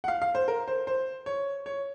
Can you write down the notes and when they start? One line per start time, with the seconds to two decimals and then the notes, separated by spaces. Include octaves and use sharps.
0.04 F#5
0.08 F5
0.22 F5
0.35 C5
0.48 A#4
0.68 C5
0.87 C5
1.26 C#5
1.66 C#5